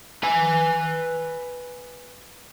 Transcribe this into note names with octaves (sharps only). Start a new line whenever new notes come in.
B4 G#5